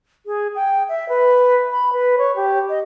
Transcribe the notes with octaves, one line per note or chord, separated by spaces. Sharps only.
G#4
G5
E5
B4
B5
B4
C#5
G4
D#5